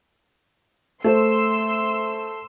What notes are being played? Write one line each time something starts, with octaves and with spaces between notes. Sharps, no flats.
A3 C5 C6 E6